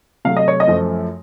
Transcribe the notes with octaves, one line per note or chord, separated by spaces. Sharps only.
C3 F#3 A3 F5
D#5
C#5
D#5
F#2 F3 A3